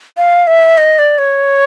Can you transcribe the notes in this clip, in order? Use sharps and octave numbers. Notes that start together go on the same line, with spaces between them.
F5
E5
D#5
D5
C#5